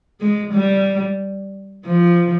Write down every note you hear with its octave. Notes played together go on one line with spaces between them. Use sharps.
G#3
G3
F3